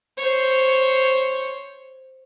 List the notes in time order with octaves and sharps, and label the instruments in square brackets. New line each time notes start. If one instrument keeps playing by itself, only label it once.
[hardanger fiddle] C5 C#5